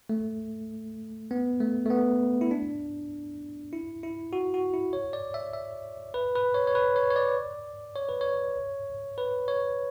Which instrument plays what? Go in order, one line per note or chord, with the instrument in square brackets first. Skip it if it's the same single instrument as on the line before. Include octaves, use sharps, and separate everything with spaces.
[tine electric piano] A3
B3
A3
A3
B3
E4
D4
E4
E4
F#4
F#4
E4
C#5
D5
E5
E5
B4
B4
C#5
C#5
B4
C#5
C#5
D5
C#5
B4
C#5
B4
C#5